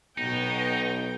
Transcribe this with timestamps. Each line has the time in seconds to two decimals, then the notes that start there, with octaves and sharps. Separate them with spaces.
0.18 B1 B2 B3 D#4 G5